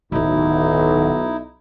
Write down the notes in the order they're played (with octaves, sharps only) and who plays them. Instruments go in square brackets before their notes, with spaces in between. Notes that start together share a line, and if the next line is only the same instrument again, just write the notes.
[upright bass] D1 D#3 [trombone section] B1 [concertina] D#4 E4